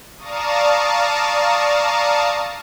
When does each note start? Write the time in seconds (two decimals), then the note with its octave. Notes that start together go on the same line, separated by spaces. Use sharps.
0.17 D5 F5 A5 A#5 C#6 D#6